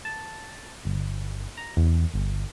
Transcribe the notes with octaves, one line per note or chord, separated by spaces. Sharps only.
A5
G1
A#5
E2
G1